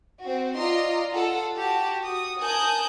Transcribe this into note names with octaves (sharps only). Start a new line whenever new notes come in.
C4 F#4
F4 D5 D#5 A#5 C6
F4 A4 F#5
F#4 G4 A5
F#4 D#6
A#4 G#5 A5 D#6 F#6 G6